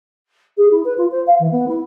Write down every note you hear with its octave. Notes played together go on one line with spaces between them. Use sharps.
G#4
E4
B4
F4
C5
F5
E3
B3
E4